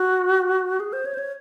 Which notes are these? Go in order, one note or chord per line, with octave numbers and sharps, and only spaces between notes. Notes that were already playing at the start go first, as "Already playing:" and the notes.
Already playing: F#4
G#4
C5
C#5
C5
C#5